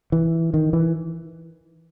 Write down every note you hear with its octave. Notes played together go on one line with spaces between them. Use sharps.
E3
D#3
E3